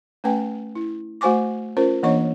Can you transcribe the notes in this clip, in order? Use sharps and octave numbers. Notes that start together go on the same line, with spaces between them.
A3 C#4 B4 G5 G#5
E4
A3 F#4 C5 G#5 C#6 D6
C#4 F4 A#4 C5
E3 A#3 D4 C#5 D#5 C#6